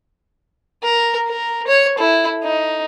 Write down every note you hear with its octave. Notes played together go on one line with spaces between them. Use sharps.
A#4
A#4
C#5
E4 A4
D#4